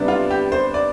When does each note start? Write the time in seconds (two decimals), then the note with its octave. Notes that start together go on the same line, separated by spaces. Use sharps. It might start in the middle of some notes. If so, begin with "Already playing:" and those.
Already playing: C3 G3 B3 D4
0.08 F4
0.30 G4
0.52 C5
0.74 D5